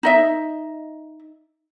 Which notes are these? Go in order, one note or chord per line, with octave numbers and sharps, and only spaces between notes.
D#4 D#5 E5